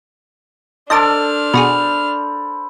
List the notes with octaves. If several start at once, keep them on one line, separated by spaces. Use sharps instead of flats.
D4 A4 A#4 C5 D#5 A5 D6 F6
B2 F#4 G#4 B5